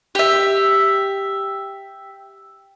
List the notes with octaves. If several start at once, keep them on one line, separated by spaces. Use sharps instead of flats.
G4 E5